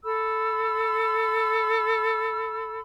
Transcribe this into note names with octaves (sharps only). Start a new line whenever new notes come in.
A4 B5 E6